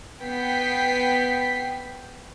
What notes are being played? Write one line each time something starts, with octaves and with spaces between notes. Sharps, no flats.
B3 G5 B6 C7